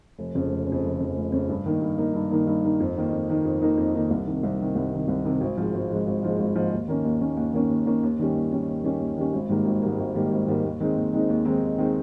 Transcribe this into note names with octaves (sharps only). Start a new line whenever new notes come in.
F1
F2 C#3
F1
C#3
F2
F1
F2 C#3
F1
F2 C#3
G2
D#3 A#3 D#4
G2
D#3 A#3 D#4
G2
D#3 A#3 D#4
G2
D#3 A#3 D#4
F2
D#3 A#3 D#4
F2
D#3 A#3 D#4
F2
D#3 A#3 D#4
F2
D#3 A#3 D#4
C2
C3 D#3
C2
C3 D#3
C2
C3 D#3
C2
C3 D#3
G#1
G#2 F3 G#3
G#1
G#2 F3 G#3
G#1
G#2 F3 G#3
G#1
G#2 F3 G#3
D#2
D#3 A#3 C#4
D#2
D#3 A#3 C#4
D#2
D#3 A#3 C#4
D#2
D#3 A#3 C#4
D#2
D#3 G3 C#4
D#2
D#3 G3 C#4
D#2
D#3 G3 C#4
D#2
D#3 G3 C#4
G#1
G#2 D#3 G3 A#3
G#1
G#2 D#3 G3 A#3
G#1
G#2 D#3 G3 A#3
G#1
G#2 D#3 G3 A#3
D#2
D#3 G#3 C4 D#4
D#2
D#3 G#3 C4 D#4
D#2
D#3 G#3 C4 D#4
D#2
D#3 G#3 C4 D#4